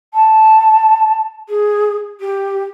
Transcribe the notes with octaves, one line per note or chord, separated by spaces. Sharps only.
A5
G#4
G4